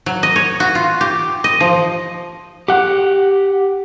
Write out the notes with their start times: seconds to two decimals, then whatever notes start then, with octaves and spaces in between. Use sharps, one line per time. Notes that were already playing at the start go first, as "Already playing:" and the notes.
0.06 F#3
0.23 D#5
0.36 C#5
0.60 F#4
0.75 F4
1.01 G4
1.44 D#5
1.60 F3
2.68 G4 F#5